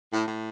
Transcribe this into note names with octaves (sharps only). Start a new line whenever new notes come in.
A2
A2